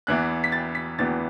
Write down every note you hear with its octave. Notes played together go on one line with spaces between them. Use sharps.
E2 E3 B3 F#6
B6
A6
B6
E2 E3 B3 A6